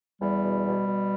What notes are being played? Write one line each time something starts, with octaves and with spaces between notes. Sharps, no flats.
E2 G3
B2
B2
B2